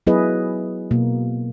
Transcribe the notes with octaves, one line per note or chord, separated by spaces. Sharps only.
F#3 B3 E4 G#4 B4 D#5
B2 A#3